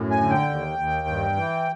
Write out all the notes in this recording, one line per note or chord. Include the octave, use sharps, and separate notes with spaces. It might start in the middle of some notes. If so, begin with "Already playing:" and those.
Already playing: F#2 A2
G#5
D3
G5
D#2
D#2
G2
E3